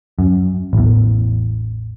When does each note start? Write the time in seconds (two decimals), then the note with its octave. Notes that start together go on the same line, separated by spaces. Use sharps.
0.19 F#2
0.73 A1 E2